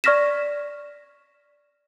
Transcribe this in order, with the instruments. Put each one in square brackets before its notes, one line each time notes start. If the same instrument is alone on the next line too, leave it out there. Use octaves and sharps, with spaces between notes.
[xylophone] D5 C#6 F6 A#6 B6 E7